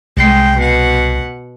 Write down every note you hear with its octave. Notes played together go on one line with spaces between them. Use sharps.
C2 G#3 G5 C7
B2 F#5